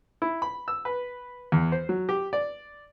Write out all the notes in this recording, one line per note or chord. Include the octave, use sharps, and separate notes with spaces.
E4
B5
E6
B4
E2
C5
F#3
G4
D5